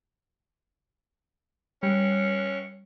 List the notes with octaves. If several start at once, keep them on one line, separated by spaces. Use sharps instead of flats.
G3 C#4